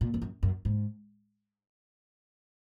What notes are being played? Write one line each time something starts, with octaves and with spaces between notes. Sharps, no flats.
A#2
F2
F#2
F#2
G#2